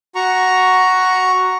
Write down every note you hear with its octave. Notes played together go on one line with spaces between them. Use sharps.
F#4 A#5 C#6